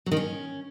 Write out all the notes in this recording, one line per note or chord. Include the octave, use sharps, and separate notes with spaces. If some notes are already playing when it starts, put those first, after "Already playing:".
F#3
D#3
C#4